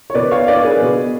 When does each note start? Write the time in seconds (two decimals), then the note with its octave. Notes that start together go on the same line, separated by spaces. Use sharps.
0.10 C#5
0.15 B2 B4 D5
0.31 C#5 F5
0.48 B4 D5
0.65 G#4 B4
0.82 B2